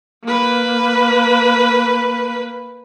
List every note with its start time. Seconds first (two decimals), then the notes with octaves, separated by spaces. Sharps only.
0.23 A#3 B4